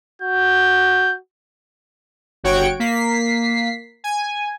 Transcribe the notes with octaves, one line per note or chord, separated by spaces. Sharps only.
F#4 G6
G1 F#4 C#5 G5 C#6 D7
A#3 B6 C7
G#5